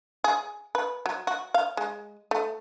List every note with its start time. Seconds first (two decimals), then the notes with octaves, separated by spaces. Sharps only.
0.24 G#4
0.75 B4
1.06 F#3
1.27 F#4
1.54 F5
1.77 G#3
2.31 A3